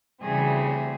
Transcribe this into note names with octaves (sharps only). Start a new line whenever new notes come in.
D2 C#3 E3 G3 C4 G#4